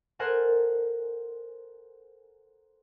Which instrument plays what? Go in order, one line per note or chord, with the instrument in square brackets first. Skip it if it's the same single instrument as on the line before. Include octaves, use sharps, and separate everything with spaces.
[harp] A4 A#4 C5 F#5 G#5